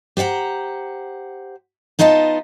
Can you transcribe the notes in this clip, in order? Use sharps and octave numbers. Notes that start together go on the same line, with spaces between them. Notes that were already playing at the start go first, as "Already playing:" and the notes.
G4 C5 C#5 F#5 A#5
B3 D#4 F4 D#5 A5